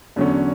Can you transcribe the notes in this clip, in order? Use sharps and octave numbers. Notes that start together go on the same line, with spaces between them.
E2 D3 F#3 C#4